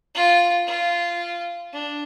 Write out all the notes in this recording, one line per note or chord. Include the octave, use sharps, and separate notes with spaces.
F4
F4
D4